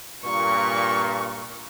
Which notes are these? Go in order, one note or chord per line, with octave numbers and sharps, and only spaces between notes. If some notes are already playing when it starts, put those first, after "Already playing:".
G2 A#2 C#6